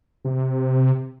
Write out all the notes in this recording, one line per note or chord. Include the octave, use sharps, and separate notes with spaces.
C3